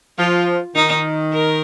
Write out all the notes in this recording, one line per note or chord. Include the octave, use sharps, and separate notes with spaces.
F3 F4
D#3 D#4
A#4